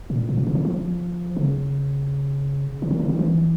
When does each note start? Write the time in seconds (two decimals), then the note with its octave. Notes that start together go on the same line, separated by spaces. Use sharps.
0.10 A#2
0.29 A#2
0.37 B2
0.47 C#3
0.55 D3
0.65 F3
1.37 C#3
2.82 D3
2.91 D#3
3.00 D3
3.09 D#3
3.19 E3